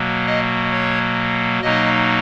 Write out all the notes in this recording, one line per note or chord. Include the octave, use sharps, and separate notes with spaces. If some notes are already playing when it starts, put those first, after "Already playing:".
Already playing: B2 F#3 A#3
D#5
C#5
B2 F#3 A#3 D#4 D#5